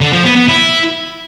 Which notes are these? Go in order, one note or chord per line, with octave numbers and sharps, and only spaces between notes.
D3
F3
B3
B3
E4